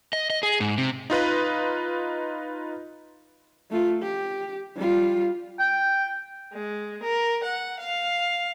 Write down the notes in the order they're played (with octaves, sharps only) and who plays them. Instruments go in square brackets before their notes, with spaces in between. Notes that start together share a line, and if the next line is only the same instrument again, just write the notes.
[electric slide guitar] D#5
D#5
G#4
G#2
C3
[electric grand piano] D#4 F4 B4 D#5
[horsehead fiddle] A3 F4
G4
G3 F4
[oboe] G5
[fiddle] G#3
A#4
F#5
F5